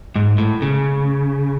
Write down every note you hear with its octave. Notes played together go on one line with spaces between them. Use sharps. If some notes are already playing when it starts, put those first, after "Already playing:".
G#2
A2
C#3